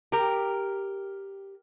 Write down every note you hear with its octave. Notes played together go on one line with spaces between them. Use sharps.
G4 A#4